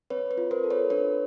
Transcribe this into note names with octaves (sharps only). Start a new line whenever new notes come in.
C4 B4 C#5
B4
F4
A#4 C5
A4
B4 C#5
D4 B4 C#5